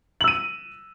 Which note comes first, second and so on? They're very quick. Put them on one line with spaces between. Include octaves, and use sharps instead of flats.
F#7 E6 D#7